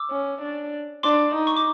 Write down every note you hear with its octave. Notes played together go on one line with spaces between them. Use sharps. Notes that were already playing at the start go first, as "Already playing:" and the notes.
Already playing: D6 E6
C#4
D4
D4 C6 D6
D#4
C#6
D6